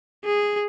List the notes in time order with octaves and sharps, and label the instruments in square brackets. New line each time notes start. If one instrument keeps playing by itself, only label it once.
[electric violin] G#4